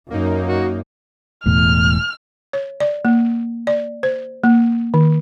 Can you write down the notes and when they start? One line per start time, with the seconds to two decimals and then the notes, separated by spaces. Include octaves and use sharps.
0.10 F#2 A#3 D#4
0.47 F#4
1.46 E1 E2 A2 F6
2.53 C#5
2.80 D5
3.05 A#3
3.67 D5
4.03 C5
4.44 A#3
4.94 D#3